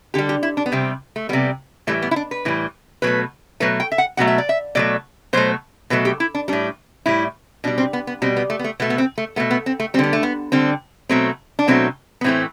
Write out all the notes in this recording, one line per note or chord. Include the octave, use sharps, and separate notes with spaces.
D3 G3 G4
G4
E4
D4
B3
C3 G3 C4
A3
C3 G3 B3
A2 E3 G3 A3
B3
E4
D4
B4
A2 E3 G3
B2 F#3 A3 B4
B2 F#3 A3 B4
G5
E5
F#5
B2 F#3 A3 F#5
E5
D5
E5
B2 F#3 A3 D5
B2 F#3 A3 C5
B2 F#3 A3 B4
G4
E4
D4
A2 G3 D4
A2 G3 E4
B2 G3 D4
C4
B3
B3
B2 G3 C4
B3
A3
B3
A3
B2 A3 B3
B3
C4
A3
B2 A3 B3
B3
C4
A3
D3 G3 B3 C4
A3
B3
D3 G3 C4
B2 F#3 A3 C4
D4
B2 F#3 A3 C4
B3
A2 E3 A3 C4